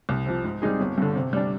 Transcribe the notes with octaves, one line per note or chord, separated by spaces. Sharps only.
C2
C3 F3
G#2
G3 C4 D#4 G#4
G1
G2 D3
C3
G3 D4